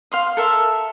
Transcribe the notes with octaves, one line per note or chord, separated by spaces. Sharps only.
F5 C6 D#6
A4 A#4 E5